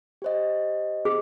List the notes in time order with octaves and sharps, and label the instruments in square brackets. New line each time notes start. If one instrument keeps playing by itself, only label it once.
[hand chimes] G4 C5 D#5
[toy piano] G#4